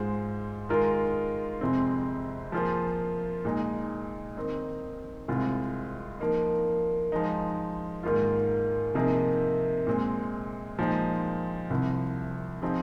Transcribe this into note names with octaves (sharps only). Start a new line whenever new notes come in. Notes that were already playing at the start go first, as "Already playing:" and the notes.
Already playing: G#2 G#3 F4 C5
D#3 G#3 F4 A#4
F2 C3 G#3 C4
F3 A#3 F4 G#4 C5
A#2 G#3 D#4
D#3 C4 D#4
C2 C3 G#3 C4 F4
F3 A#3 D#4
F3 G#3 D#4
G#2 D#3 A#3 F4
C3 F3 A#3 D#4 G#4
A#2 G#3 C4
A#2 F3 G#3 D#4 C5
C2 C3 F3
F3 C4 D#4 G#4